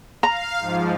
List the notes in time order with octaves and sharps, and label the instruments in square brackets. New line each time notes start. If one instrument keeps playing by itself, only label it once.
[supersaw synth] F5 [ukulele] A#5
[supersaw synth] G#2 F3